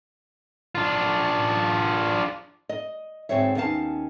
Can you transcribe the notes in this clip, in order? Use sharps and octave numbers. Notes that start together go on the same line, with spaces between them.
D4 F4
D#5
D2 G#2 C4 G#4 C#5 E5
D#2 B3 C#4 D#4 F5 A5